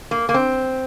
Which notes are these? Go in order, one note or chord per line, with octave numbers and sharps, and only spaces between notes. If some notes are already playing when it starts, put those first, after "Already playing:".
A#3
A#3
C4